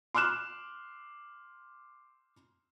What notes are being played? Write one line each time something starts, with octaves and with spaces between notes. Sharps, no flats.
C6 D6 F6 F#6 E7